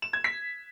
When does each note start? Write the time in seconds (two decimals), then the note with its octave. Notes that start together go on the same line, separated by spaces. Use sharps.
0.02 E7
0.13 G#6
0.24 B6